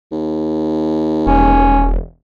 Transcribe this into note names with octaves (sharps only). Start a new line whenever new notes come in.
D#2
E1 C#4